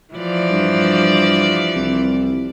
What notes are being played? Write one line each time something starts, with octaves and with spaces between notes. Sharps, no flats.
E3 F3 D5
G2
C2